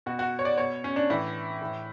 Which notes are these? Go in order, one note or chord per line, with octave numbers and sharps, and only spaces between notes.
B2 F#4
F#4
C#5
D5
B2 C#5
C#4
D4
A2 E3 E4
A2 E3